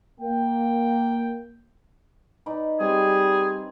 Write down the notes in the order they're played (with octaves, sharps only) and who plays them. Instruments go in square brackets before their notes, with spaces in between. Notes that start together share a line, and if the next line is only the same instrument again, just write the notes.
[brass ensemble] A#3 G5
[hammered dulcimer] D#4 B4 D5
[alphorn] G3 [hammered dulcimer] C4 [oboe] G#4